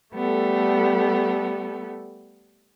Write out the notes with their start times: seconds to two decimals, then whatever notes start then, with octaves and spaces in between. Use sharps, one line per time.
0.14 G3 A3 B3 A4